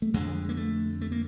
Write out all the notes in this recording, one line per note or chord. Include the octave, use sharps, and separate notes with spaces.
A3
F2 D3 G#3
A#3
A3
A3
A#3